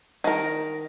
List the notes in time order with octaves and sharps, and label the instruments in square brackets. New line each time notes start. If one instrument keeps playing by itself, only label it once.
[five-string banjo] D#3 A#4